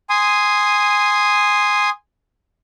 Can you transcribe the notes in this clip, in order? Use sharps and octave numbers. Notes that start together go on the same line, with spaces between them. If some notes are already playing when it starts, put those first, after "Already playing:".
G#5 C6 D#6